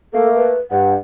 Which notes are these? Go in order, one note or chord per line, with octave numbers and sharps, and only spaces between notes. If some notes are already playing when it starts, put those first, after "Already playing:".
A3 A#3 A4
B4
G2 F#5